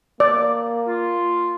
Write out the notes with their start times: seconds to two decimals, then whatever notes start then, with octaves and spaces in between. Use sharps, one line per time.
0.20 A#3 D5
0.87 F4